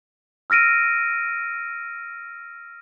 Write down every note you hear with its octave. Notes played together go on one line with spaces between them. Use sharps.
E6 F6 A#6 D7 D#7